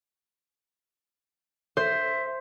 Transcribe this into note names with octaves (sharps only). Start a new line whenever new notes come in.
C5 E5